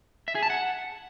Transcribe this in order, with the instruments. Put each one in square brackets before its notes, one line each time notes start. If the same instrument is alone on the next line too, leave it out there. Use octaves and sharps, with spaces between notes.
[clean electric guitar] E5
G#4
A5
F#5